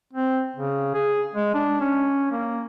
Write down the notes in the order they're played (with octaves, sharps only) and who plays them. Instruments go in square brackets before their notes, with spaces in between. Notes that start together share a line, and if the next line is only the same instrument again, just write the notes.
[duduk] C4
C#3
G#4
G#3
D4
C#4
A#3